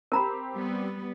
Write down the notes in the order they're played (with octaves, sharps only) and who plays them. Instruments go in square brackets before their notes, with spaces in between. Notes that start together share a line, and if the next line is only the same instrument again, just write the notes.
[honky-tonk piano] C4 G4 [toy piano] A#4 A#5 B5
[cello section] G3 B3